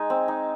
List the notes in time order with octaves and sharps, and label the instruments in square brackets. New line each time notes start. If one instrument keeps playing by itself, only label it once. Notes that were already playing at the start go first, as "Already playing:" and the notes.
Already playing: [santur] G#3 D#4 G#5
C4
D#4